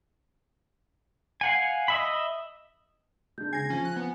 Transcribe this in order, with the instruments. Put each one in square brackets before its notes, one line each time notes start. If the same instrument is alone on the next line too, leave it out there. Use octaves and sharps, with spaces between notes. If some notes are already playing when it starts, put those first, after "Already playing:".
[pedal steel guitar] F5 F#5 G#5
D#5 E5 B5
[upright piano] G#3 D4 [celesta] G6
[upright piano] C#3 C7 [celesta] G#5 A#6 [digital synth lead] G#6
[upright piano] F3 [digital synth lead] C#4
[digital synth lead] F#6
[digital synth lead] B3 [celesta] G#5